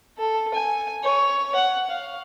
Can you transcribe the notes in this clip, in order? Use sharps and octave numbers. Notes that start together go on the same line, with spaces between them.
A4
G#5
C#5
F#5
F5